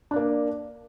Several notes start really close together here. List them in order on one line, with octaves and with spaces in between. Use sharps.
D4 D5 A#3